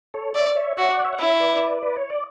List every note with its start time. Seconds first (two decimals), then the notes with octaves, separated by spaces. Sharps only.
0.14 A4 C#5
0.35 C#5 D5 E5
0.55 C#5 E5
0.77 F#4 C#5 E5
0.91 D5 F#5
1.04 C#5 E5
1.13 F#5
1.19 E4 C#5 E5
1.40 B4 D5
1.83 B4
1.97 C#5
2.10 D5